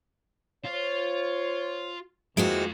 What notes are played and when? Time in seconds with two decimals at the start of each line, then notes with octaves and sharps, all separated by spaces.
0.65 F4 C5 C#5
2.37 F2 D#3 E3 G#3 A#3 C4 F4 F#4